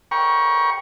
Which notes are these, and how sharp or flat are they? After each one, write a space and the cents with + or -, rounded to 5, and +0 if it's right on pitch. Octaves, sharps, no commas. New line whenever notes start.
G5 +0 A#5 +40 C#6 +0